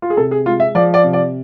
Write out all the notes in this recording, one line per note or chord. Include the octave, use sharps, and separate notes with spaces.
F4
G#4
C3 A4
G#4
G#3 F4
E5
F3 D5
D5
C3
D5